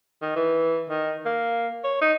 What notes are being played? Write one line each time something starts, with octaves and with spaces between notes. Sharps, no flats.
D#3
E3
D#3
A#3
C#5
D#4